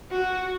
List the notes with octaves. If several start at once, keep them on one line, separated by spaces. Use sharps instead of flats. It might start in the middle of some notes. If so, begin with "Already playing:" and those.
F#4